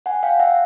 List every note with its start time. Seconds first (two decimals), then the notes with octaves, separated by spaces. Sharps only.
0.06 F#5 G#5
0.23 F5 G5
0.39 E5 F#5